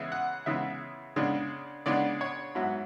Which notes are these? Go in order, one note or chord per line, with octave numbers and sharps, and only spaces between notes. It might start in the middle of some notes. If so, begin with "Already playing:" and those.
Already playing: C#3 E3 G#3 B3 E4
F#5
C#3 E3 G#3 B3 E4 E5
C#3 G#3 B3 D4
C#3 G#3 B3 D4 D5
C#5
G#2 F#3 B3 E4